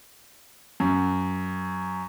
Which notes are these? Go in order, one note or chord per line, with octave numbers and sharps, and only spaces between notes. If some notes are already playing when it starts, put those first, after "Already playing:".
F#2